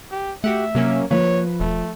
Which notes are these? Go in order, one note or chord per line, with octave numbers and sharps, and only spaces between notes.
G4
A3 F#4 G4 E5 F#5
C3 F#3 A#3 C#4
F3 A#3 B4 C#5
E1 A3